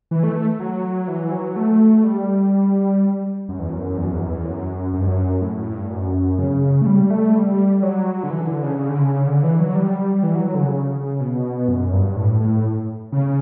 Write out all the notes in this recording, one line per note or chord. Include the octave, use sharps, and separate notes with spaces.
E3
A3
A3
F#3
E3
F#3
A3
G3
F#2
E2
F#2
E2
F#2
E2
F#2
E2
F#2
F#2
G2
F#2
A2
A2
G2
F#2
C#3
A3
G3
A3
G3
F#3
D3
E3
D3
C#3
C#3
D3
C#3
D3
E3
F#3
G3
E3
F#3
F#3
D3
C#3
B2
F#2
G2
A2
A2
C#3